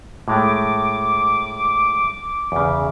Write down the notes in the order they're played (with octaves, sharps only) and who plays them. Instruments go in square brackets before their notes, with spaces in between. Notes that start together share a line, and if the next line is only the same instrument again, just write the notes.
[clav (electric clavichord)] A2 G#3 A3 [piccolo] D6
[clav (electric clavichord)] E2 C#3